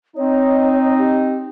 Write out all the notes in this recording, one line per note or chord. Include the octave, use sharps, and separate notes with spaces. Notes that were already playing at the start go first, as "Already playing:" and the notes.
C4 D#4 C#5
G4